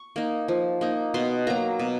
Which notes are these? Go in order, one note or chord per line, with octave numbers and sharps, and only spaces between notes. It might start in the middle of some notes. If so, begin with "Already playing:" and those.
Already playing: C#6
A#3 D#4
F3
A#3 D#4
B2 C6
F#3 A#3 A#5
B2